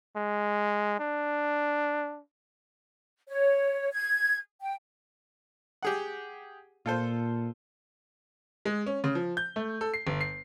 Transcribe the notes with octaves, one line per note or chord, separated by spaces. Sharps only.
G#3
D4
C#5
G#6
G5
G4 G#4 F#5
A#2 F4 A4 C5
G#3
C#4
C#3
F3
G6
A3
A4
C7
G1
C7